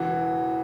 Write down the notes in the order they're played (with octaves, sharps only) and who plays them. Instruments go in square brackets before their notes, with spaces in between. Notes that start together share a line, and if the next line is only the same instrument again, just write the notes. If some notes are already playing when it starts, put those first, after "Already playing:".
Already playing: [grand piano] E1 C#3 E3 F#4